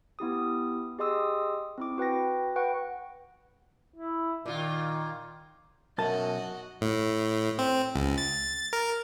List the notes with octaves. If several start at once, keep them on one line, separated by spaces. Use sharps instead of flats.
B3 E4 G4 D#6
G4 G#4 D#5 C6 D#6 E6
C4 E4 D6
F#4 B4 G5 A#6
B4 F#5 G5 C#6
E4
A#2 D#3 F4
B1 F#2 F#4 D#5 A5
A2
C4
C#2
A6
A#4